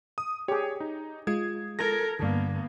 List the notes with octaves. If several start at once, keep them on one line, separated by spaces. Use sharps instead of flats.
D#6
G4 G#4 C#5
D#4
G#3 F4 G#6
A4 A#4 G#6 A#6
G2 D3 A#3 B3